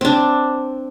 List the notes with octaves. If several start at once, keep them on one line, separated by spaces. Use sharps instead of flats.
C4 D4